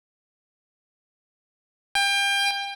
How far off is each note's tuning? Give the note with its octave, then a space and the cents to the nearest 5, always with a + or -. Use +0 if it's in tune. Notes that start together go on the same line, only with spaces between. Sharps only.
G5 +30